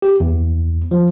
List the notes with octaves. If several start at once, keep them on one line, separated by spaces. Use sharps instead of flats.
G4
E2
F3